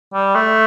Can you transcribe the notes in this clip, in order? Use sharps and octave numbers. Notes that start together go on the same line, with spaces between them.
G3
A3